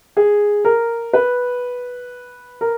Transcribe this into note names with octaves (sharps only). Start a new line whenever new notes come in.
G#4
A#4
B4
A#4